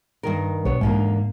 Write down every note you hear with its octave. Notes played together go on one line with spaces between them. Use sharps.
G2 D#3 A#4
B1 B3 D4 C#5
E2 G#2 D3 A#3